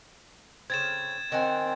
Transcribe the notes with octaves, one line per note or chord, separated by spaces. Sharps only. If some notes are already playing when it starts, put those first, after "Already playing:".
C#3 C4 G#6 A6 E7
D#3 C4 F#5 G#5